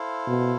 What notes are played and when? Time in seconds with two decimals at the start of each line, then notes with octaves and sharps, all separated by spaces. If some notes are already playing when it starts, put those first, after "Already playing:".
Already playing: E4 A4 C5 F5
0.27 B2